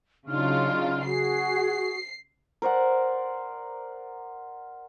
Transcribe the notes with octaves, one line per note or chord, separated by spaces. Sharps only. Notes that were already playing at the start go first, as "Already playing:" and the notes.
C#3 F#3 D4 D#4 F4 F6
F#4 G#4 C7
A#4 C5 D5 F#5